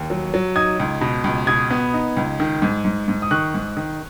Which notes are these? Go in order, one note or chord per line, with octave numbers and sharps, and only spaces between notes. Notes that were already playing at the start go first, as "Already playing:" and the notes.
Already playing: D#2
F#3
F#3
D#4 D#6 G#6
C#2
B2
C#2
B2 D#6 G#6
B3
D#4
C#2
D#3
G#2
G#2
G#2
D#6
D#3 C#6 F#6
G#2
D#3